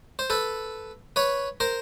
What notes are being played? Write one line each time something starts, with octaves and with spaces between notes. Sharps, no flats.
C5
A4 B4
B4 C#5
A#4 C5